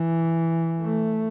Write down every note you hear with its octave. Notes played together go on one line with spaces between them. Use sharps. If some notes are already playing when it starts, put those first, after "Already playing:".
Already playing: E3
A3